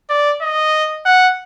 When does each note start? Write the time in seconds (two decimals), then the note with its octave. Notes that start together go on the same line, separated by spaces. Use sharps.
0.10 D5
0.42 D#5
1.05 F#5